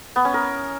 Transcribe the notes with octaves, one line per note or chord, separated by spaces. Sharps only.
B3
C#4
A#4